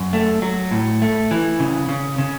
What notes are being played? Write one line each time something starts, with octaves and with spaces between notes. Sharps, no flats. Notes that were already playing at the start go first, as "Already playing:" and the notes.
Already playing: F#2
A3
F#3
A2
A3
E3
C#3
C#3
C#3